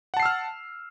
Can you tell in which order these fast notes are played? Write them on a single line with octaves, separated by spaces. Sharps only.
F#5 A5 C7 E6 F6